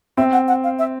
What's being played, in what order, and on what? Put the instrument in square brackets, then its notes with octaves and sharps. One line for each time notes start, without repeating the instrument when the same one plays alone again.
[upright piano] C4 [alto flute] E5
[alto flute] F#5
F#5
F5
E5